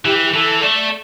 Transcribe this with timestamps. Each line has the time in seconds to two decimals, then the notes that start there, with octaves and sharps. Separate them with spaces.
0.05 E3 G4
0.24 G4
0.33 E3 A4
0.62 A3 D5